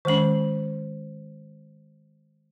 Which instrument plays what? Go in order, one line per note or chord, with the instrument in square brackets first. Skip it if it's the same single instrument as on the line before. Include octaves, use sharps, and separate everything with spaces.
[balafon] D#3 G#3 C#4 [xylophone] C5 F#7